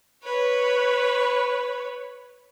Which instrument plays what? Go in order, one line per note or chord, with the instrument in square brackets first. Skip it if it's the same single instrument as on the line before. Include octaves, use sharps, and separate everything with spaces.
[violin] B4 C#5